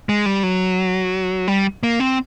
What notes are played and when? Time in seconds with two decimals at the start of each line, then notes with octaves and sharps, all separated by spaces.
0.09 G#3
0.26 G3
0.43 F#3
1.48 G3
1.83 A#3
2.00 C4